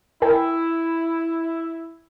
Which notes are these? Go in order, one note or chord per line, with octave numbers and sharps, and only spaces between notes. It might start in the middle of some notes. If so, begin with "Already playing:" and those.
E4 A#4 G5 G#5